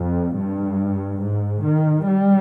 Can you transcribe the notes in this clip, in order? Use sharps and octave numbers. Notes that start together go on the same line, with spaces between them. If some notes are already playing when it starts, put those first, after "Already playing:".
Already playing: F2
G2
G#2
D#3
G3